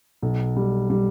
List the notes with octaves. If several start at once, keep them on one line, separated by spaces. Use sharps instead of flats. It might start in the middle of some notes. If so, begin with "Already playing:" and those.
B1
G3
G3